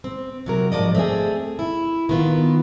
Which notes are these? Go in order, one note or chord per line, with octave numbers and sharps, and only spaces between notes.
C4
C3 F#3 A#4
G#2 F3 D5 D#5
A3 C4 G#4
E4
D#3 B3 F4